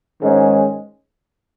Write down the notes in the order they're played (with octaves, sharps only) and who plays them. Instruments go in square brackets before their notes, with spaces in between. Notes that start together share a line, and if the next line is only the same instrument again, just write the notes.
[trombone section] G#2 D#3 G#3 C#4